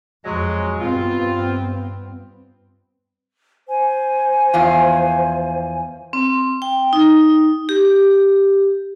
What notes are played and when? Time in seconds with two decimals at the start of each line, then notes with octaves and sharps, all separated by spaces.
0.25 F2 F#3 G#3
0.79 G2 B3 C4 F4
3.68 C5 G#5
4.54 E2 F3 F4
6.13 C4
6.62 G5
6.93 D#4
7.69 G4